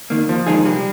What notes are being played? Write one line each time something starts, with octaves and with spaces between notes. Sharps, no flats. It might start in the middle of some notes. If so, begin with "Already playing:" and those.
D#3 A#3
D#2 F3
D#3 G#3 D#4 G#4
C2 G3